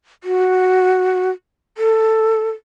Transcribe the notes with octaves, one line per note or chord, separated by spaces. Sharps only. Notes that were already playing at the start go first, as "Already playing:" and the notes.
F#4
A4